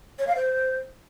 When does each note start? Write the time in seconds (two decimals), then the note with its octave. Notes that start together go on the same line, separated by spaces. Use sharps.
0.19 C#5
0.27 F5
0.35 C5